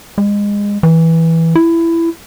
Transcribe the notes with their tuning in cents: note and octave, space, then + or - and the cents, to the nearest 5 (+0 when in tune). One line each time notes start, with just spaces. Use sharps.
G#3 -25
E3 -10
E4 +15